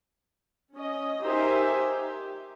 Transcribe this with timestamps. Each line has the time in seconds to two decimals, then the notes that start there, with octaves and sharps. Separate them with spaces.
0.74 C#4 D#5
1.22 D#4 G4 A#4 C5 E5 G#5
1.77 G4